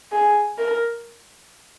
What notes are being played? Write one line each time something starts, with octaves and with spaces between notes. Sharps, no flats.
G#4
A#4